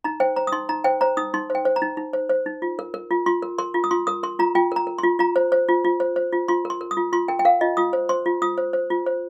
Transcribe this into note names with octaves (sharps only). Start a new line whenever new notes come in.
D#4 A#5
C5 G5
C5 A#5
D#6
D#4 C6
D#4 A#5
C5 G5
C5 A#5
D#4 D#6
D#4 C6
C5
G5
C5
A#5
D#4
D#4
C5
C5
D#4
F4
A#4
A#4
F4
F4 C6
A#4
A#4 C6
F4
D#6
F4 C6
A#4 D#6
A#4 C6
F4 A#5
F4 G5
A#4 A#5
A#4
C6
F4
F4 A#5
C5
C5
F4
F4
C5
C5
F4
F4 C6
A#4
C6
A#4
D#6
F4
F4 C6
A#4 G5
G5
A#4 F5
F4 D#5
F4 D#6
C5
C5 C6
F4
F4 D#6
C5
C5
F4
C5